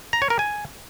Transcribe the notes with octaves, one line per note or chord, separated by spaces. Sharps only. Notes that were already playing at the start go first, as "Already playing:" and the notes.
A#5
C#5
A#4
G#5